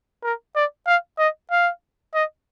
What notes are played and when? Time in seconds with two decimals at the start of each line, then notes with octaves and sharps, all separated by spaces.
0.23 A#4
0.56 D5
0.87 F5
1.18 D#5
1.51 F5
2.14 D#5